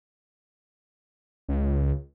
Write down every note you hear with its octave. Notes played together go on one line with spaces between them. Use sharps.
C#2